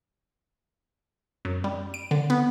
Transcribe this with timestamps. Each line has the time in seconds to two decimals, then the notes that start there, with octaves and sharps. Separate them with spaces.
1.45 F#2
1.64 G3
1.94 D7
2.11 D3
2.30 B3